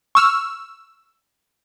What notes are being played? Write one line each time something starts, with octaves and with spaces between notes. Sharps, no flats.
C#6 E6 F6